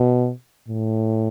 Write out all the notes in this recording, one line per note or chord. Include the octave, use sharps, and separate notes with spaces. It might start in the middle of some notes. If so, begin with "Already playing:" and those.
Already playing: B2
A2